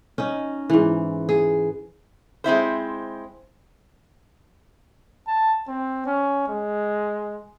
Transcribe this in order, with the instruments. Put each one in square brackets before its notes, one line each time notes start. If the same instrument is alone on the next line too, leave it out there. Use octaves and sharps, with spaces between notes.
[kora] C#4 D#4
G#2 E3
G#4
[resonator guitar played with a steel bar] G#3 C4 E4 C5
[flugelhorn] A5
C4
C#4
G#3